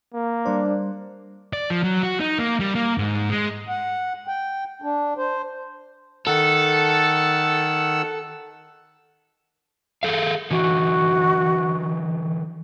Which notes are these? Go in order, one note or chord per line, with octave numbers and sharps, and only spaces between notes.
A#3
G3 D4 C5
D5
F3
F#3
F#4
D#4
A#3
G3
A#3
G#2
G#3
F#5
G5
D4
C5
D#3 A4 F#5 E6
G#4 A4 F5
D3 E3 F#4